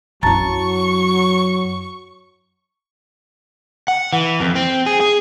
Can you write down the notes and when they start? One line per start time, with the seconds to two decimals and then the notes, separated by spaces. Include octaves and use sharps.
0.23 F#2 F#3 E4 A5 A#5 C#6 A6
3.88 F#5
4.13 E3
4.40 F2
4.56 C4
4.86 G#4
5.00 G#4